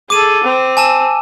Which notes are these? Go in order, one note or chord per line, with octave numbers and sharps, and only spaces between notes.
G#4 A4 D6 D#7
C4
G#5 A5 E6